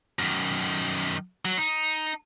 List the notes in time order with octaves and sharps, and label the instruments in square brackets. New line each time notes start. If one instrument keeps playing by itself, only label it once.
[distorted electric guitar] F#2 D#3
F#3
D#4